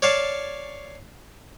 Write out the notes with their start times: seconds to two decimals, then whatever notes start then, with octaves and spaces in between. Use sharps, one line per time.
0.02 C#5 D5 F5 A5